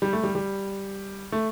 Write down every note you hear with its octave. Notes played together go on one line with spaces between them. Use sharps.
G3
A3
G3
G3
A3